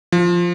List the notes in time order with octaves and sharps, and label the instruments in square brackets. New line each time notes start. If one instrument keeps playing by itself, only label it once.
[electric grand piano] F3